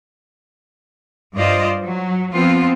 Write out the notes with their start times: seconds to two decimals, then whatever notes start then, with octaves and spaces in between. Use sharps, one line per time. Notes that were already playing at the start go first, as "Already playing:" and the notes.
1.36 G2 F4 C5 D5 D#5
1.83 F#3
2.33 F3 B3 C4 F4